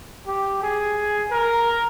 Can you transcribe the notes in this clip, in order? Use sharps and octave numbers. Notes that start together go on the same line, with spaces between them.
G4
G#4
A#4